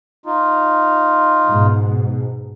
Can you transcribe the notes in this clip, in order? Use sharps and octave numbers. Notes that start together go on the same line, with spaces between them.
D#4 F4
G#2 B2